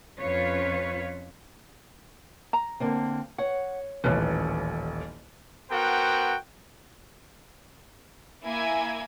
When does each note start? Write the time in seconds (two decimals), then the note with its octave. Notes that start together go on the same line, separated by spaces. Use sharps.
0.19 F2 C#4 F4 B4 C#5
2.53 A#5
2.80 D3 A#3 C4
3.38 C#5 F#5
4.04 D#1 A1 B4
5.71 B3 F#4 A#4 C5 F#5 G5
8.44 A#3 E4 E5 G#5 G#6